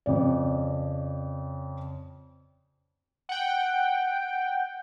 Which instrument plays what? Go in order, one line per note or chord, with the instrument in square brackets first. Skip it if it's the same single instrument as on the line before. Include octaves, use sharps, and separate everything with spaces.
[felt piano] F2 C#3 D5
[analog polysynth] F#5 G5